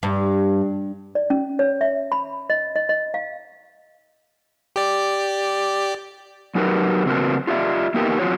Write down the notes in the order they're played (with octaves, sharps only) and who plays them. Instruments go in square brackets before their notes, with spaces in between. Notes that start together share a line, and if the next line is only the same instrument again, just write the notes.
[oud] G2
[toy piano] D5
C#4
C#5
E5
B5
D#5
D#5
D#5
F5
[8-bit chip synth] G4 D5
[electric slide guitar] F#3 D#4 F#4 G4 A#4 B4
A2 C#3 C4 F#4 A#4 B4
F4 G4 D5 E5
A#3 B3 D#4 G4 A#4
F#3 C4 F4 F#4 C#5